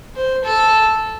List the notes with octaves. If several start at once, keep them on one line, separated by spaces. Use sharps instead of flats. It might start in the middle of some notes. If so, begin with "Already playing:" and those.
C5
A4